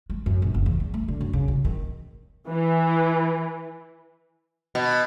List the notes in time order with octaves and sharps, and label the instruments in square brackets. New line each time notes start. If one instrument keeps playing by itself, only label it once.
[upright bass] G#3
F#2
A#1
F#1
E2
E2
A3
D3
F#2
C#3
B1
D#3
[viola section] E3
[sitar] B2